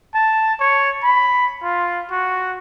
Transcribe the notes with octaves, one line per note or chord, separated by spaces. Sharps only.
A5
C#5
B5
F4
F#4